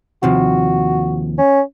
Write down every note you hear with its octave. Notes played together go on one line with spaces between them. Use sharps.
D#2 C3 F3 F#4
C#4